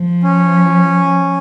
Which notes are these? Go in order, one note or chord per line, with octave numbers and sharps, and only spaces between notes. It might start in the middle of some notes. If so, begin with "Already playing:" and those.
Already playing: F3
C#4